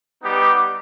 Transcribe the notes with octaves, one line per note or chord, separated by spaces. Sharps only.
G3 B3 D#4 G4